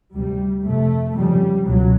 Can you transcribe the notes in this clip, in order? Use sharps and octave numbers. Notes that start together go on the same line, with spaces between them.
D2 C3 G3
F2 C3 A3
F2 C#3 G3
C#2 B2 F#3